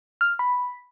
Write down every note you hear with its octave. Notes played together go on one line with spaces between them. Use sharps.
F6
B5